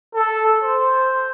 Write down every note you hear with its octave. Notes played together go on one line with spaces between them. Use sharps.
A4
C5